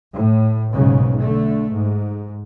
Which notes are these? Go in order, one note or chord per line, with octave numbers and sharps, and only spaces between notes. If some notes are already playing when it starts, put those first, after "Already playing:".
A2
B1 G#2 C#3
D3 A3
G#2